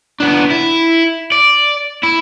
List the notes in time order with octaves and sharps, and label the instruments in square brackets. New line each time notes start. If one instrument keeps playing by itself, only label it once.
[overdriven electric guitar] B3 D4
E4
D5
E4